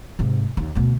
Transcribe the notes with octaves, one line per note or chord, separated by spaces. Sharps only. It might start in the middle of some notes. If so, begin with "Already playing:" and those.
G#2 C3
D#2
D2 B2